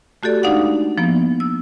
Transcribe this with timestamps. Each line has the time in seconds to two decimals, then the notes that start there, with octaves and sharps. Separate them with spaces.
0.23 A3 F#4 G4 A4 D5
0.43 G#3 D4 D#4 D5 F5 F#5
0.98 F3 A#3 B3
1.40 E6